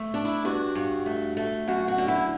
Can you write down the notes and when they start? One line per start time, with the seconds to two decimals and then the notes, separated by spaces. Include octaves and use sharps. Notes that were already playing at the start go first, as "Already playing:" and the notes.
Already playing: A3
0.14 D4
0.25 E4
0.45 G2 F#4
0.75 G2
1.06 A3
1.37 A3
1.68 F#2 F#4
1.88 F#4
1.98 D3
2.08 E4